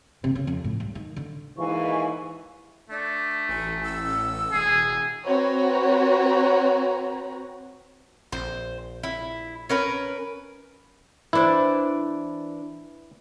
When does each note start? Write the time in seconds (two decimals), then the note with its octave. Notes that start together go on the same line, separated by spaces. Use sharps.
0.24 C3
0.35 C#3
0.47 F2
0.64 A2
0.80 G2
0.95 D#3
1.16 D3
1.58 D#2 G#2 E3 F5 G#5 C#6
2.90 A3 D4
3.49 A1 G#5
3.83 E6
4.52 E1 G#4
5.27 C4 F#4 B4 C#5 A#5
8.32 A#1 C5
9.03 E4
9.69 C#4 A#4 B4
11.33 E3 D4 E4 C5